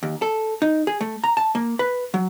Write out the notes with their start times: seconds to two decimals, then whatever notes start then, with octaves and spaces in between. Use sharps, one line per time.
0.03 D#2
0.22 A4
0.62 D#4
0.87 G#4
1.01 A3
1.24 A#5
1.37 A5
1.55 A#3
1.79 B4
2.14 F#3